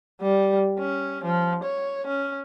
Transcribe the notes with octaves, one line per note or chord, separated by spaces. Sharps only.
G3
C#4
F3
C#5
C#4